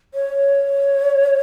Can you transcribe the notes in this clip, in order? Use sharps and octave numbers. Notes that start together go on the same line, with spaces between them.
C#5